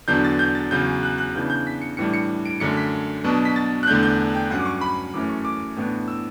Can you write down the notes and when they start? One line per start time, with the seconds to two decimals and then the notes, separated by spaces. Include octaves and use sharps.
0.08 E2 D3 F#3 B3 D4 G6
0.25 A6
0.39 G6
0.55 A6
0.71 E2 C#3 F#3 G6
1.03 F#6
1.18 F#6
1.35 C#3 E3 B3 D4 G6
1.50 G6
1.67 B6
1.82 C#7
1.97 A2 E3 G3 D4 C#7
2.14 C#7
2.46 D7
2.60 F#2 D3 A3 C#4 C#7
2.77 B6
3.24 B2 F#3 B3 D4
3.45 B6
3.56 A6
3.83 F#6
3.87 E2 D3 A3 D4 G6
4.03 G6
4.35 G5
4.50 G2 F#3 C#4 F#5
4.60 D6
4.66 C#6
4.81 B5
5.14 F#2 E3 A3 C#4 D6
5.30 C#6
5.45 D6
5.76 A2 E3 B3 D4
6.08 E6